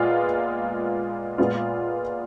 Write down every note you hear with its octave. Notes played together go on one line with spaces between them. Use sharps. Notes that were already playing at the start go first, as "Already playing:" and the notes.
Already playing: A#2 G#3 B3 F4
A#2 G#3 B3 F4